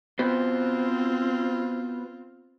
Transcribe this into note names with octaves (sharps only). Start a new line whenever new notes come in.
B3 C4 F4 F#4 C5